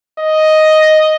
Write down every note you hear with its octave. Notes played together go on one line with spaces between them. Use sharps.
D#5